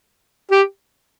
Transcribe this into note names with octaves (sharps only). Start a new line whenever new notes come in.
G4